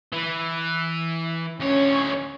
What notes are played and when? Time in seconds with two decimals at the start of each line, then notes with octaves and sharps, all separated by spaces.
0.12 E3
1.60 D2 C#4 C#5